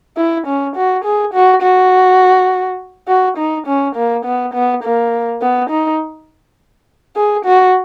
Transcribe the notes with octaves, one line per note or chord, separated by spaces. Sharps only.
E4
C#4
F#4
G#4
F#4
F#4
F#4
D#4
C#4
A#3
B3
B3
A#3
B3
D#4
G#4
F#4